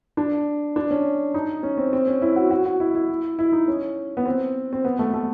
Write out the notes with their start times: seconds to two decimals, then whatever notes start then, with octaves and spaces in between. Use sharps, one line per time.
0.17 D4
0.76 D4
0.91 C#4
1.34 D#4
1.63 C#4
1.78 C4
1.93 C4
2.07 C#4
2.22 E4
2.36 F#4
2.50 F#4
2.66 F#4
2.80 E4
2.95 E4
3.39 E4
3.52 D#4
3.68 C#4
4.17 B3
4.26 C4
4.73 C4
4.85 B3
4.99 A3
5.14 A3